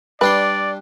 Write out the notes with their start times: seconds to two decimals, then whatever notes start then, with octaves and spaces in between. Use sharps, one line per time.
0.21 G3 D4 B4 D5 C6